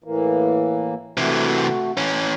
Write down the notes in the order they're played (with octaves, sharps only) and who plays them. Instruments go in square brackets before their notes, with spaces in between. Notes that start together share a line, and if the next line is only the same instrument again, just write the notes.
[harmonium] A2 E3 A#3
[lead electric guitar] C3 E3 [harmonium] A3 F#4
[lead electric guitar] E3 C#4